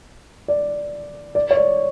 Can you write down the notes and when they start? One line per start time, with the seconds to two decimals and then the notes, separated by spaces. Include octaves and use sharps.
0.48 D5
1.35 D5
1.51 C#5
1.57 D5